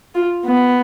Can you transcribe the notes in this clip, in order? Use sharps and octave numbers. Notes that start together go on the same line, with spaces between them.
F4
B3